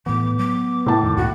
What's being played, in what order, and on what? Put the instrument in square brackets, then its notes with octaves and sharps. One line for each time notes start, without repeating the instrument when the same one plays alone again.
[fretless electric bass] A2 E3 [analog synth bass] B3 [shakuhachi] D6
[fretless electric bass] F#3 [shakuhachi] D6
[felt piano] A2 A5 [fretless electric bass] C3
[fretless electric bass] F2 A#2 D3 [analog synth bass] D#3
[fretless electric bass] C#2 G2 A#2 [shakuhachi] F#4